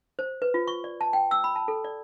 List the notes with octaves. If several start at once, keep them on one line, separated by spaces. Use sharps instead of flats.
C5
B4
F4
C#6
D5
A5
G5
E6
B5
A5
A4
D5